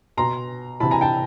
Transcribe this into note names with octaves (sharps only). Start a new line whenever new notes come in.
B2 A#5 C6
C3 E3 A5 B5
G#5 A#5
G5 A5